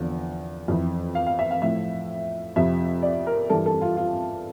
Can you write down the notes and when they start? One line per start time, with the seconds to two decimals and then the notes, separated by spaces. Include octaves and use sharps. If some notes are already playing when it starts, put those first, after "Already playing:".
Already playing: E2 D3 F3
0.68 F2 E3
1.15 F5
1.27 F5
1.39 E5
1.51 F5
1.62 A2 F3 E5
2.56 F2 C3 F3 E5
3.02 D5
3.27 A#4
3.50 G2 E3 A4
3.66 A4
3.82 F4
3.97 F4